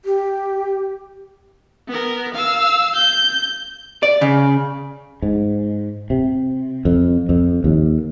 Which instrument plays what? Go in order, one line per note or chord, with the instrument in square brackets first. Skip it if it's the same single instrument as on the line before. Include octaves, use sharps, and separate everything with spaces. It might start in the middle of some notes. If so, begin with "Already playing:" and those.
[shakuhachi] G4
[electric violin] B3 A#4
F5 E6
G6
[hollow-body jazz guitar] D5
C#3
[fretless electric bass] G#2
C3
F2
F2
D#2